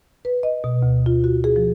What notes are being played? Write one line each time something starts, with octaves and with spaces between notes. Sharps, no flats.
B4
D#5
B2
D2
F4
F#4
G#4
F3